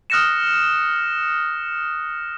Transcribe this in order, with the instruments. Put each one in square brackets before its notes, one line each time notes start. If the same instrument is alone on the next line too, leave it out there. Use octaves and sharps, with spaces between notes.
[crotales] D#6 F6 F#6 A#6 C#7 E7